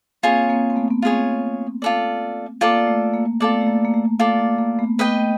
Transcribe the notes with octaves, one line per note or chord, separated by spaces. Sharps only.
A#3 C4 F4 G#4 C#5
A#3 C4
C4
A3 B3
B3
A#3 C4 F4 G#4 C#5
F4 A4 D5
A#3 F4 A4 D5
A3
A#3
A3 B3 F4 A4 D5
A3
A#3
A#3
A3
A3 F4 A4 D5
A#3
A#3
A3 B3
A3 B3 B4 D#5 G5
A3